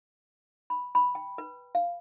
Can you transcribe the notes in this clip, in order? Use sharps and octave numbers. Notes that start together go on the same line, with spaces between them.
B5
B5
G5
B4
F5